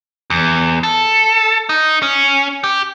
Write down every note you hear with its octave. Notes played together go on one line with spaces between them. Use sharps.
E2
A4
D#4
C#4
G4